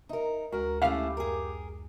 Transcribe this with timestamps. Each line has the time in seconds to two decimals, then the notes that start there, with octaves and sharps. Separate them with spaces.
0.09 D#4 A#4 E5
0.52 D2 G#3 F#4 A#4 A#5
0.82 A3 C#4 E4 G4 E5 F5
1.17 F#2 G#4 A#4